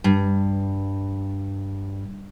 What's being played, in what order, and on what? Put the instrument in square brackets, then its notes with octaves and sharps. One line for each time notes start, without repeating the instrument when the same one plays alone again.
[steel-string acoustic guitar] G2